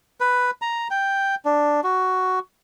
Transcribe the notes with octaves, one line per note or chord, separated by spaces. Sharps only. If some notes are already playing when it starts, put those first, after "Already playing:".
B4
A#5
G5
D4
F#4